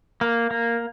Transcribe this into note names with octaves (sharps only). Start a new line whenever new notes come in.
A#3
A#3